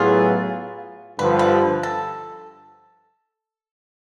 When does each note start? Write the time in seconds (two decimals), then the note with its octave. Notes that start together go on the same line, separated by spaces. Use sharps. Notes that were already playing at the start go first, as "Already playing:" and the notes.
Already playing: A2 F#3 B3 E4 F4 G#4
1.19 G2 D3 F3 B4
1.39 B4
1.83 A4